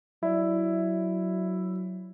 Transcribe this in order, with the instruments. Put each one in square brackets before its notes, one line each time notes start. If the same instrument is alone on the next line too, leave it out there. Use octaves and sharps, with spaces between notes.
[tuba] F#3 [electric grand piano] E4 [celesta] D5 E5